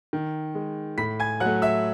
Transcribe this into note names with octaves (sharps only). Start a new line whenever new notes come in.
D#3
G#3
A2 B5 B6
G#5 G#6
F#3 F#5 F#6
A3
E5 E6